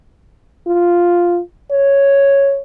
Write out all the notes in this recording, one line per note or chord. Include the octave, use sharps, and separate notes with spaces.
F4
C#5